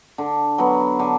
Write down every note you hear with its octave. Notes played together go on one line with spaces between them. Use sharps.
D3
F#3 B3
D3